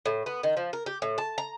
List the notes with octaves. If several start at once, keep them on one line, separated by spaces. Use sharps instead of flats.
A2
B3
D#3
F3
A#4
G4
A2
A5
A#5